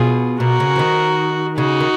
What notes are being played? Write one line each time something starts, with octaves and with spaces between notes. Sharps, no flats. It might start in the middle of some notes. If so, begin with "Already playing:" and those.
Already playing: B2 F4 G#4
B2 F#4 A#4
C#3
F3
D#3
C#3 D#4 F#4
D#3